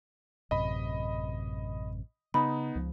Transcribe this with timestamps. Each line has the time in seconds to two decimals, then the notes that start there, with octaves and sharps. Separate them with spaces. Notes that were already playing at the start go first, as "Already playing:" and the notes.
0.51 A1 F#2 C3 D#5 B5
2.34 C#3 B3 D#4 B5
2.75 C#2 F3